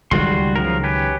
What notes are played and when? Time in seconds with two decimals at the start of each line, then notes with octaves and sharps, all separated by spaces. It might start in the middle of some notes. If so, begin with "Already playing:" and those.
0.11 C#2 D#3 F#3 G3 F#4 C6
0.56 C#3 F3 A#4
0.83 C#4 G4 B4